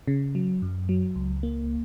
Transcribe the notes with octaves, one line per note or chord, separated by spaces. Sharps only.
C#3
F#3
F#2
F#3
C#2
A#3